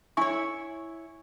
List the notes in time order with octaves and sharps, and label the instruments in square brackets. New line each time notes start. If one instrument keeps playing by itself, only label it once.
[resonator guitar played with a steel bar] E4 C#5 [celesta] G#5 C#6